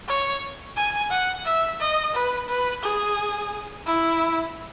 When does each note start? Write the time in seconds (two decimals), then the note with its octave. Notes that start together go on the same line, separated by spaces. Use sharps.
0.08 C#5
0.77 G#5
1.11 F#5
1.45 E5
1.81 D#5
2.14 B4
2.49 B4
2.83 G#4
3.86 E4